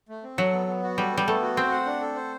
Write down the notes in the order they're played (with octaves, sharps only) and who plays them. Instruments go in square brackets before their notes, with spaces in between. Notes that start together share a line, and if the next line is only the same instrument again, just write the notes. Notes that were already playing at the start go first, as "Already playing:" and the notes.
[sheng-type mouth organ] A3
C4
[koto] F#3 [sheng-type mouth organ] A4
[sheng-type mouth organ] B3
B3
F#4
[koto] G3 [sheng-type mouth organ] A4
[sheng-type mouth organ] B3
[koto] G3
[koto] A3 [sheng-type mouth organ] B3
[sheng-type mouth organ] F#4
[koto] C4 [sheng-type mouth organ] C5
[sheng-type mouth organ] F#5
D4
A4
C5